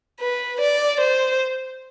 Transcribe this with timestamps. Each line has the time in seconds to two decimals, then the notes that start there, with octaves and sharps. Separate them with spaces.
0.20 B4
0.60 D5
1.00 C5